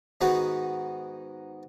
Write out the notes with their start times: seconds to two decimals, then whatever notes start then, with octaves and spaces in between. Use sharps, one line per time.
0.21 G#2 D#3 B3 F#4 B5